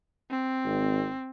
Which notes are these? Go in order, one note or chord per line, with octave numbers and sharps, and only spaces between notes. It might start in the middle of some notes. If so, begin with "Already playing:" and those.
C4
G#1